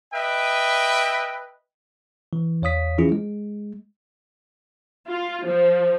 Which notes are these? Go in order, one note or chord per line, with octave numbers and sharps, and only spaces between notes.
B4 D#5 E5 G5
E3
E2 C#5 F5 D#6 B6
E3 F3 C#4 E4 F4 G#4
G#3
F4
F3